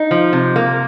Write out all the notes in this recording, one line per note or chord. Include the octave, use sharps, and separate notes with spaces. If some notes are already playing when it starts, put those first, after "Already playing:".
Already playing: D#4
F3
C3
A#3